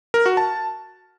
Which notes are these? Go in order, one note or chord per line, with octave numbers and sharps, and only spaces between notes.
A#4
F#4
A5